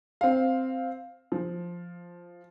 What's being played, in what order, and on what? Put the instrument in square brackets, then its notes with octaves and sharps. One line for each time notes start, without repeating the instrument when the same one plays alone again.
[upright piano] C4 F5
F3